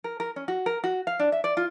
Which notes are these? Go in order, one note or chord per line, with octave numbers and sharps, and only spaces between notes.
A#4
A#4
C#4
F#4
A#4
F#4
F5
D4
E5
D5
F4